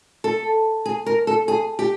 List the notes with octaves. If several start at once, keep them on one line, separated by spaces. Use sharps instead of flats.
A4
G#4
A#4
A4
G#4
G4